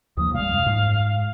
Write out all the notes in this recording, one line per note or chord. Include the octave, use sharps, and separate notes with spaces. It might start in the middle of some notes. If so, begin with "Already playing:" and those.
D#2 F3 A#3 D#6
C3 G3 G#3 F5
F#2
G#2